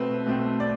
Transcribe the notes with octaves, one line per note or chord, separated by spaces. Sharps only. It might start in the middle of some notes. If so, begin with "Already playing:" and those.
Already playing: B2 A3 C4 B4
B2 A3 C4
D5